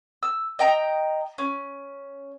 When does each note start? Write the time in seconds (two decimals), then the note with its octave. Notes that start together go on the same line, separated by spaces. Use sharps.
0.23 E6
0.59 D#5 G5 A#5
1.38 C#4